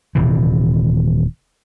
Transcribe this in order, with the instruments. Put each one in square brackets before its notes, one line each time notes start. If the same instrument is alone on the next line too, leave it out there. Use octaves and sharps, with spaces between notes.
[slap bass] D#1 C3 E3